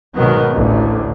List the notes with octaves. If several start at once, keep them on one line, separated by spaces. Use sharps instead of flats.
G#2 B2 D#3 F#3 B3
A1 D2